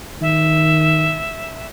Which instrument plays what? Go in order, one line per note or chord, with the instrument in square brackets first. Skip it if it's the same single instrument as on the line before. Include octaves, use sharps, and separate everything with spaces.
[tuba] D#3 [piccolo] E5